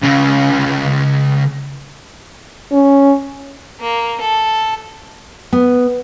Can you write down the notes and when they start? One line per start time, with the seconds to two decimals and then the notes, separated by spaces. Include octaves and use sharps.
0.03 C#2 C#3
2.72 C#4
3.80 A#3
4.20 A4
5.52 B3